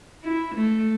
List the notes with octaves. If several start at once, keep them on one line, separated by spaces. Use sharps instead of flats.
E4
A3